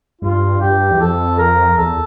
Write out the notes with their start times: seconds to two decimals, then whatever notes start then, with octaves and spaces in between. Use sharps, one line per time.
0.21 G2 F4
0.61 G2 G4
0.90 E2
1.00 F2 A4
1.39 A#4
1.78 E2 A4